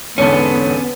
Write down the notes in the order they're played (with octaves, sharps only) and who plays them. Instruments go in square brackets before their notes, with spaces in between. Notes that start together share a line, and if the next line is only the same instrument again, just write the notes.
[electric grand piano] E2 G#2 D3 [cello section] B3 [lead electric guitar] C#4 A4 [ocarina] C#5